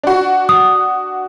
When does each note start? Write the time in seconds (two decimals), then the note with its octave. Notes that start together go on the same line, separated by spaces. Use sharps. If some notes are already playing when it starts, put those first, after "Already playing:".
0.03 D4 F#4
0.49 D#6